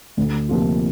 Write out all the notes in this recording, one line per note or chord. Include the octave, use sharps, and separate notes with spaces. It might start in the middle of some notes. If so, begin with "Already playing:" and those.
D2
C3 F3 A#3 F4